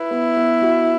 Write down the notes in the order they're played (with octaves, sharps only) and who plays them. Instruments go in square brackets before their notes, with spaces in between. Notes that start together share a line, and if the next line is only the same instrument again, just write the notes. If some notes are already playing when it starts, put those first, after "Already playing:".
Already playing: [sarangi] E4 [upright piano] B4
[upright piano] B3
B3
F#4